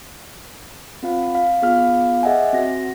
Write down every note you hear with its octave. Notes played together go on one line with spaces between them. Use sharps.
C4 F4 F5
F5
B3 F4 G#4 F5 F6
G#4 D#5 E5 F#5 G#5
C4 F#4 A#6